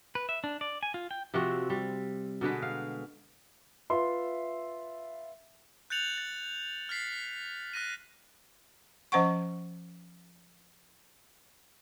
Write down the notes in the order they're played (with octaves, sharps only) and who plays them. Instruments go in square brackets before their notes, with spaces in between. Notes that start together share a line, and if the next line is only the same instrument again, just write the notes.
[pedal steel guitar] B4
E5
D4
D5
G#5
F4
G5
[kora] C3 F3 C4 F#4
G3
B2 D3 G#3 B4
F5
[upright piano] F4 B4 E5 C6
[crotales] F#6 G6 A6 C#7 F7 F#7
A6
F6 A6 B6 C7
F6 F#6 A#6 D#7
[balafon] F3 C#4 C5 F5 F#5 C#6